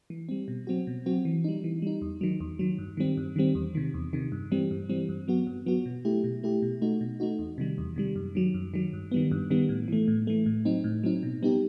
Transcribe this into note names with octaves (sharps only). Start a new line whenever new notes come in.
E3
G3 C4
B2
F#3 C4 F#4
B2
F#3 C4 F#4
E3
G3 D#4
E3
G3 D#4
E2
D#3 F#3
E2
D#3 F#3
G2
D#3 G3 C4
G2
D#3 G3 C4
E2
C3 D#3
E2
C3 D#3
G2
E3 G3 C4
G2
E3 G3 C4
G2
F#3 B3 F#4
G2
F#3 B3 F#4
B2
A3 E4 G4
B2
A3 E4 G4
B2
A3 D#4 F#4
B2
A3 D#4 F#4
E2
C3 D#3 G3
E2
C3 D#3 G3
F#2
D#3 F#3
F#2
D#3 F#3
G2
D#3 G3 B3
G2
D#3 G3 B3
A2
E3 A3
A2
E3 A3
A2
F#3 C4 D#4
A2
F#3 C4 D#4
B2
G3 B3 D#4 G4